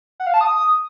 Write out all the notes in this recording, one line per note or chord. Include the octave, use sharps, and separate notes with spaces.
F#5
F5
A5
D#6